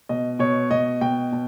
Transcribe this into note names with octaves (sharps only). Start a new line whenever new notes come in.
B2 D#5
B2 C#5
B2 D#5
B2 G5
B2